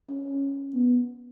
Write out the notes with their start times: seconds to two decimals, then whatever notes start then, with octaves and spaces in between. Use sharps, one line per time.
0.10 C#4
0.74 B3